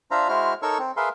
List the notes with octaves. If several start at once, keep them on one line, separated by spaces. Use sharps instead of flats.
D4 F4 C5 E5 F5 A#5
G#3 E4 F#4 C5 F6
D#4 A4 A#4 C#5 C#6 E6
C4
G#4 A#4 B4 E5 F5 C6